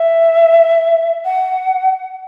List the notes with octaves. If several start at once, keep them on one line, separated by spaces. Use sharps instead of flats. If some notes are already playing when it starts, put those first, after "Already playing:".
Already playing: E5
F#5